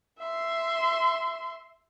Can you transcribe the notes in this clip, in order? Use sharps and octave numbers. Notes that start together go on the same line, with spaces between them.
E5 C6